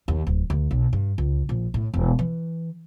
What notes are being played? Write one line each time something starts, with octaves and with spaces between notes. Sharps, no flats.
D#2
D1
D2
B1
G2
C#2
A#1
A2
E1
E3